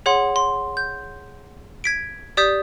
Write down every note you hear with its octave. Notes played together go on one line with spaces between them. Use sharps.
G#4 C#5 F#5 C6
C6
G6
G#6 B6 D7
G4 D5 D#6 G6 B6